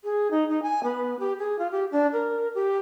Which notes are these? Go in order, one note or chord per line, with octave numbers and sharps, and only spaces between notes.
G#4
D#4
D#4
G#5
B3
G4
G#4
F4
G4
D4
A#4
G4